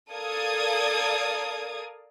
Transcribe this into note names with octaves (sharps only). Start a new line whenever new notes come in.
A4 A#4 D5 F5 D#6 G#6